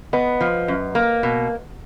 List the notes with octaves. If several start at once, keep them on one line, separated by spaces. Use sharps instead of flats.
B3 B4 D#5
F3
F#2
A#3
B2